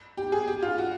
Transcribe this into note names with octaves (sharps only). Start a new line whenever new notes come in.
G4
G#4
G4
F4
F#4